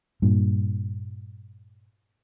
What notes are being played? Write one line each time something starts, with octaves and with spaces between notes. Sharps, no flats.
G2 A#2